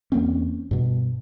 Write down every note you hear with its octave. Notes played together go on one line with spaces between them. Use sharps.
E2 A#3 C4 C#4
G2 B2